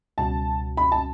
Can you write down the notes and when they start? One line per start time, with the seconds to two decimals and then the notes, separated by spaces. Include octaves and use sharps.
0.18 C#2 B2 G3 C#4 F#4 A5
0.77 B5
0.92 A5